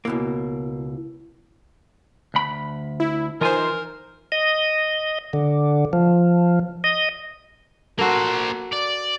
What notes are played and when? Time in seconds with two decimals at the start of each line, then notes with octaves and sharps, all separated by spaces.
0.05 C#2 B2 A#3 E4
2.34 D2 B5
3.00 E4
3.41 E3 D#4 F4 A#4 C5 G#5
4.32 D#5
5.33 D3
5.93 F3
6.84 D#5
7.99 A#3 F#4 A4 A#4 C5
8.72 D5